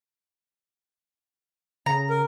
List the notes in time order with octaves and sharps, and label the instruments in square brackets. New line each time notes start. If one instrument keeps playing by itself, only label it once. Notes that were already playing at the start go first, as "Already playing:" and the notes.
[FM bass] C#3 [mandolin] A#5
[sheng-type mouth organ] A#4